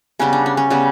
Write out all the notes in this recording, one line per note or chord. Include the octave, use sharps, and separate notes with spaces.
C#3 G3 B3 C#4
D4
C#4
C#4
C#3 G3 B3